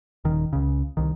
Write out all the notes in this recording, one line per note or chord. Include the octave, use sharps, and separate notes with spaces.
D#1 D#3
C#2 C#3
C2 D#3